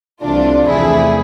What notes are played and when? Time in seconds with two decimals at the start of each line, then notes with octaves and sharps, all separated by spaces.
0.22 C2 C3 E3 A3 D4 F4
0.68 E2 C3 F3 A3 E4 G#4